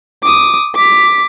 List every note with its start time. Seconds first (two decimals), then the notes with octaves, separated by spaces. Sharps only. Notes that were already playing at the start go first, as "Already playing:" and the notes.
0.23 D6 D#6
0.75 D6 B6